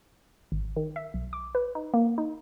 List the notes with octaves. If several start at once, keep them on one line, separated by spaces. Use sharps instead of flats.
G#1
D#3
E5
B1
D6
B4
D#4
A#3
D#4